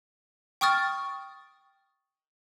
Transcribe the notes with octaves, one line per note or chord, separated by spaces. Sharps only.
G5 C#6 D#6 F6 A6